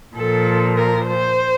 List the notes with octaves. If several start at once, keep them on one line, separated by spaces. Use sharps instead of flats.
A#2 F3 A4
A#4
C5